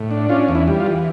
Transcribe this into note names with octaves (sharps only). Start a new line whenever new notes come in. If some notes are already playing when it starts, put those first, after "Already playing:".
Already playing: A2
D4
C#4 F4
E2
E4
G3
F4
E3